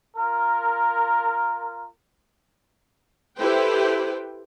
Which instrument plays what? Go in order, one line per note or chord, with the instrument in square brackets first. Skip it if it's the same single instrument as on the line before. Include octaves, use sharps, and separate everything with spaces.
[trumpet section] F4 A#4
[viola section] E4 G4 A4 B4 C5 G5